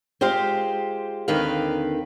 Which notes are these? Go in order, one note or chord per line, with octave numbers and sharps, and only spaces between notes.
G#3 F4 G4 C5
D#2 D3 D#3 C4 B4 F5